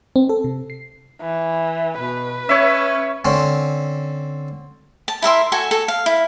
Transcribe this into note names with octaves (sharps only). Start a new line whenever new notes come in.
C4
A4
C3
C7
E3
B2 B4
C#4 C#5 E5
D3 C4 C#4
A5
E4 A#4 E5 C6
F#4 A4 G#5
A4
F5
E4